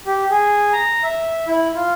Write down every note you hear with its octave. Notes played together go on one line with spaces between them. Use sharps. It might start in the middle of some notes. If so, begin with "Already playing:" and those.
G4
G#4
A#5
E5
E4
F4